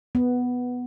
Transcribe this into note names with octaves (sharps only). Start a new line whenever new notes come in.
B3